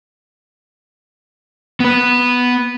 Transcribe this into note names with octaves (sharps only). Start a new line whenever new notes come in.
B3 B4